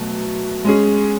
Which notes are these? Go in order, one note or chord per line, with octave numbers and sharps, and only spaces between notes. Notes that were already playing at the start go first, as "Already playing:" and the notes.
Already playing: B2 F#3 A3
G#3 C#4 G#4